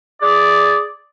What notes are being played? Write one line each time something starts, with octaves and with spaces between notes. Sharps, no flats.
G#4 D5